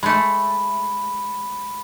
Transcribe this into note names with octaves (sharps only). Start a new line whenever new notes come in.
G#3 A3 B5